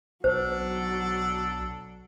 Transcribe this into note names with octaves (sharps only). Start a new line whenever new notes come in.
B1 F#3 D4 A4 C5